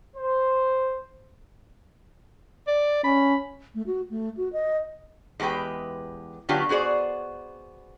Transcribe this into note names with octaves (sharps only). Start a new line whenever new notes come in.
C5
D5
C#4 B5
A3
F#4
A3
F#4
D#5
E2 G#3 G4 B4 G5
A2 D3 F#3 B3 F4 G4
B3 F#4 G#4 C5 D5